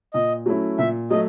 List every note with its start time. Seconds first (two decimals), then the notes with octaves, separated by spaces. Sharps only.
0.14 A#2 D#5
0.46 F#3 A3 C#4 E4
0.78 A#2 E5
1.11 F#3 A3 D#5